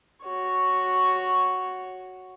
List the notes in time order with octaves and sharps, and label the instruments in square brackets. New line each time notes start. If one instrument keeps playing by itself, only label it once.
[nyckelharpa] F#4 C#5